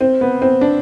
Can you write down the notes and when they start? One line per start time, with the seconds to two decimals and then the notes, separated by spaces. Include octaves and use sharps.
0.01 C4
0.21 B3
0.42 C4
0.61 D4